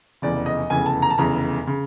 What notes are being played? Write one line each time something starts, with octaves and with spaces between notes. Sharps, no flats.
F1 E2 C#3 D5
D#5
F1 E2 C#3 G#5
A5
A#5
A5
F1 E2 C#3 A#5
C#3